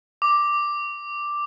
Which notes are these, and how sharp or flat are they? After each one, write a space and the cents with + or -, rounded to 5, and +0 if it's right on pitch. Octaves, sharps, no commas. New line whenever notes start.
D6 +0